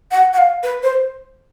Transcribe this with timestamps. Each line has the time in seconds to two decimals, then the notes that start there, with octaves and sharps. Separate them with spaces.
0.11 F#5
0.33 F#5
0.38 F5
0.63 B4
0.83 C5